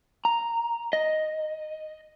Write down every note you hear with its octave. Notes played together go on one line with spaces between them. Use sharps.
A#5
D#5